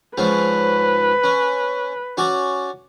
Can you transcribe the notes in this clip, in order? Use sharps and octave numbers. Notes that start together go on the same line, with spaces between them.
G#2 F3 C#4 B4
C#4
C#4 F#4 D5